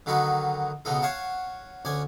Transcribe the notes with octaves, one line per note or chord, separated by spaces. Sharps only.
D3 D#3 F#3 D#4 F#4 B4
C#2 B2 B3 D#4 A4
C#5 F5 F#5 A5
D2 C#4 D5 G#5